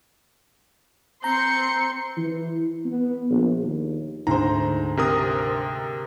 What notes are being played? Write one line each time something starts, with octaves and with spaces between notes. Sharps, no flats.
C4 A#5 C6 G6 C#7
E3
B3
A#1
D#2
D2 G#2 C5 A#5
C3 A#4 D#6